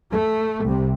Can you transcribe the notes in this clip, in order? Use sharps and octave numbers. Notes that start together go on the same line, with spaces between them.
A3
C2 C3